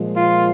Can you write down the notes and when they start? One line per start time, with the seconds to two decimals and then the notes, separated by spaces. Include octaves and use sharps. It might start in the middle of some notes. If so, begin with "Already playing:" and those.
Already playing: A#2 F3 G#3
0.16 F4